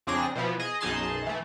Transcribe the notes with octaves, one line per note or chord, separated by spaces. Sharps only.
F2 C#3 C4 D4 G#4 A#6
B2 E3 F3 B3
G#4 D#5
B1 F#2 D#4 G#4 A5 C6
E3 A3